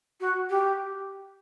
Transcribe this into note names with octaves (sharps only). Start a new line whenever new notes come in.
F#4
G4